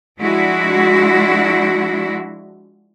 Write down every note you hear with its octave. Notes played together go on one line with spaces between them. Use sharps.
F3 G#3 D4 E4 F#4